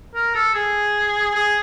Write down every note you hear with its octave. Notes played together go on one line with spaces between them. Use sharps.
A#4
A4
G#4
G#4